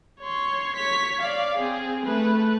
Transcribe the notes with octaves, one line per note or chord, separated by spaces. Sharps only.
C#5 C6
C#5 B6
D5 F5
C4 G#4
A3 B4